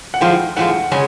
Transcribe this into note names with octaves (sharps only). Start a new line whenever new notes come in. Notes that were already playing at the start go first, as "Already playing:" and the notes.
F#5
A2 F3 G#3 G5
A2 F3 G#3 F#5
C#3 G#3 C#4